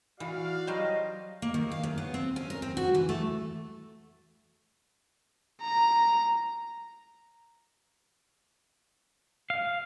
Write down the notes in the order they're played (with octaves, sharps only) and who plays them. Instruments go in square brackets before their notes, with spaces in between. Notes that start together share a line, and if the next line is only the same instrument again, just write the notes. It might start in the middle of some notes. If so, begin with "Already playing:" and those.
[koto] E3 [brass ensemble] F#4 D5 F5
[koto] F#3 G3 C5 [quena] D#5
[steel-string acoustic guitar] A#3
D#3
F5
F#2
B3
C4
C#4
A#4
C4
F#4
E3
A3
[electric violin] A#5
[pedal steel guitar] F5